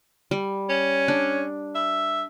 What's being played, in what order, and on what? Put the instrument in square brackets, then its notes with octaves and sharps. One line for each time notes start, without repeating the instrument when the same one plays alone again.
[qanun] G3
[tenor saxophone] C#4
[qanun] D4
[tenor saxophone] E5